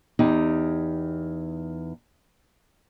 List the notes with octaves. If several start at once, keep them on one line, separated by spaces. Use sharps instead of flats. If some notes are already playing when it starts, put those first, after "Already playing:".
E2 D#4 G4